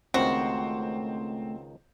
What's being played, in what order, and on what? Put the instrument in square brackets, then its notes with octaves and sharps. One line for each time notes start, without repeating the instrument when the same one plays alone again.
[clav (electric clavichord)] C#2 D#3 [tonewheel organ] A3 [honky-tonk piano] C4 C5 [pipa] F#4